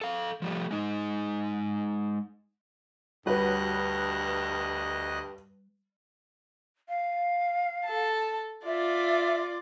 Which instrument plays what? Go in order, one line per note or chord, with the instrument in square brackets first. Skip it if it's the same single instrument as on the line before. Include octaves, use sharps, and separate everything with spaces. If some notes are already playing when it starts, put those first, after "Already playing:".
[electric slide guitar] A4 F5
F3 G3 A3
G#3 D#4
[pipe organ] D2 D#5 F#6 [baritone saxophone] G2 [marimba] G3 [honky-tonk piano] F#4 B4 C#5
[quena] F5
[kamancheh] A4 A5
[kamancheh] F4 D5 [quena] E5